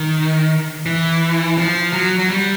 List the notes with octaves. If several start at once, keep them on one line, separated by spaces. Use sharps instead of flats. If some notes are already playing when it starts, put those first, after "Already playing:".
Already playing: D#3
E3
F3
F#3
F#3
G3